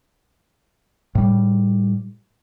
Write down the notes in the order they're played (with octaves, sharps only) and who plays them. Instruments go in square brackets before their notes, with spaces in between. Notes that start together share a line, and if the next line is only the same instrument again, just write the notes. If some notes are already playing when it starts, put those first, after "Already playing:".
[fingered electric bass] A2 G3